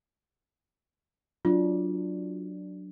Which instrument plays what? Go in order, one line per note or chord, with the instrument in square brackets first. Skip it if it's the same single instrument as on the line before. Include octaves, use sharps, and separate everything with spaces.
[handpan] F#3 D4 [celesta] F4